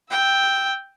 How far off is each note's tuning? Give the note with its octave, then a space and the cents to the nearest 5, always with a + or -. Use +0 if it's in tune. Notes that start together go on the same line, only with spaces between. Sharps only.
G5 +0 E6 -10